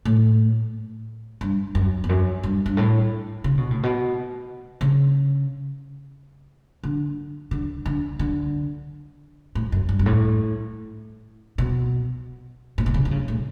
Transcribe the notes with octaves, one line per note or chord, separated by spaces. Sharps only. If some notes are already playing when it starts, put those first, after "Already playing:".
A2
G2
F#2
E2
F#2
G2
G2
A2
C#3
B2
A2
B2
C#3
D3
D3
D3
D3
A2
F#2
G2
G2
A2
B2
A2
B2
C#3
D3
C#3
A2